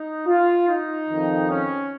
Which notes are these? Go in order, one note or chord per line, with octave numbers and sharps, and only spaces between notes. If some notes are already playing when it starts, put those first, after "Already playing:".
Already playing: D#4
F4
D#4
F2 D#3
C#4